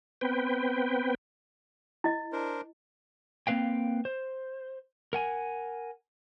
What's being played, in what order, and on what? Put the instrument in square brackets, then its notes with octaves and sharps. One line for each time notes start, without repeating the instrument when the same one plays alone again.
[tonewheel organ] B3 C4 B4 G5
[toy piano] E4 D#5
[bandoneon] D4 A#4 C5
[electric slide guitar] A#3 C4 B4 F5 G5
C5
A#4 F#5 G#5